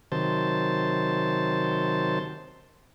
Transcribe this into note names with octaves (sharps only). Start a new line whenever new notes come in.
C3 D#3 F#3 C5 A5